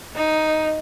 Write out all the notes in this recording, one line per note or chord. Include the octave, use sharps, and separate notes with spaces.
D#4